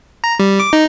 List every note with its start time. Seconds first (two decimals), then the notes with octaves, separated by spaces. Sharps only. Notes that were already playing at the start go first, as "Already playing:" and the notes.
0.24 A#5
0.39 G3
0.60 D6
0.73 D#4